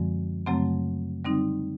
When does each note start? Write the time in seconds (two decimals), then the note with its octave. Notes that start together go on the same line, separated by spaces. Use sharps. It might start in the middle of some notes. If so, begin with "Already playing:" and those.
Already playing: F#2 D3 F3 G#3 C4
0.46 F#2 C#3 F#3 A3 C4
1.25 D3 G3 C4 D#4